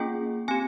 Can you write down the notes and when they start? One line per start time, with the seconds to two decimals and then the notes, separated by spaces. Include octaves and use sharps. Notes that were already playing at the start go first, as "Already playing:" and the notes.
Already playing: A#3 C#4 F4 G#4 G5
0.48 C4 G4 G#5